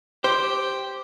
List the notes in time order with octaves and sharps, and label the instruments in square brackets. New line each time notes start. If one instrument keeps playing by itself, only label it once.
[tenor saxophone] G4 [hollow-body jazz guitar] C5